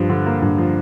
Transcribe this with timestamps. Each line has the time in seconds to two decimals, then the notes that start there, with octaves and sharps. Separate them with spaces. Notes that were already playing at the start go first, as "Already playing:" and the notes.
Already playing: G2 F3
0.10 D3
0.26 A#3
0.42 G2
0.58 F3